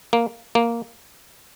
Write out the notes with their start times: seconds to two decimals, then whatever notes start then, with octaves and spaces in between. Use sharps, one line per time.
0.13 A#3
0.55 A#3